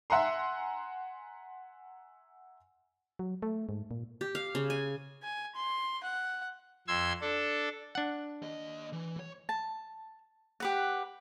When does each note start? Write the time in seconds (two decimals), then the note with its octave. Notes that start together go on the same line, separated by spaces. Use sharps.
0.10 E5 F#5 G#5 A#5 C6
3.19 F#3
3.42 A3
3.69 G#2
3.91 A#2
4.21 G4
4.35 F5
4.55 C#3
4.70 G#5
5.23 G#5
5.55 C6
6.04 F#5
6.88 F2 C6 E6 G#6
7.21 D4 A4
7.95 D4 F#5
8.42 D#2 D#5
8.93 E3
9.19 C#5
9.49 A5
10.60 G4 B4 F#5